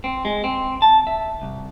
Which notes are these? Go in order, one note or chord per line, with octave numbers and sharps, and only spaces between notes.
C4
G#3
C4
A5
E5
C2